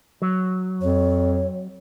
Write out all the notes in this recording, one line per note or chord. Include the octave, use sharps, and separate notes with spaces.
F#3
F2 C#5